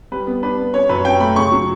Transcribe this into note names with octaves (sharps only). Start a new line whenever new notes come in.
G3 B4
B3
D4 B4
B3
C#4 C#5
F#2 B4
C#4 G5
A3 B5
C#3 C#6
F#3